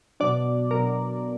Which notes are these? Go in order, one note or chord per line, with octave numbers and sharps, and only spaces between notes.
B2 F#3 D4 D5
B2 F#3 D4 A#4